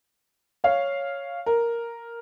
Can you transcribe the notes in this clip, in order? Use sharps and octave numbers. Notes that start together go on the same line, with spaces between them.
C#5 F5
A#4